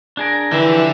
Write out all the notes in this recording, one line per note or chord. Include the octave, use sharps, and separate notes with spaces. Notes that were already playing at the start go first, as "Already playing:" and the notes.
D4 G#4 A#4
D3 E3 F3 G4 E5